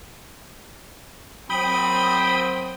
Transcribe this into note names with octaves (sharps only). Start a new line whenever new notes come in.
F#3 A#3 C4 G5 B5 D#6